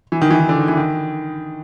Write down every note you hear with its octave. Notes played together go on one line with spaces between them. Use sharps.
E3
D#3
E3
D#3
D3
D#3
E3
D#3